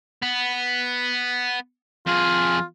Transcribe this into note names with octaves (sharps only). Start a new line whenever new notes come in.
B3
F2 F4 G#4